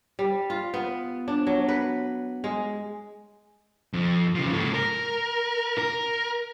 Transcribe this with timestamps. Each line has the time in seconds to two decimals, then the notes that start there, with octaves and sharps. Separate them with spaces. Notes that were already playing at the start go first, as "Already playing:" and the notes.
0.19 G3
0.50 F4
0.74 B3
1.28 D4
1.47 F#3
1.68 B4
2.44 G#3
3.93 F2
4.35 C#3 F3
4.52 G#2 A4
4.74 A#4
5.78 A#4